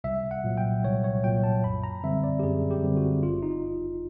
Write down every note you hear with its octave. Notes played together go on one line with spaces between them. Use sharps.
C2 E5
F#5
A#2 F#3
G5
C2 C#5
C#5
A#2 F#3 G5
A5
F#2 B5
A#5
D3 G3 C4 E5
D5
G4
F#2 G#4
G4
D3 G3 C4
F#4
G1 F4
D#4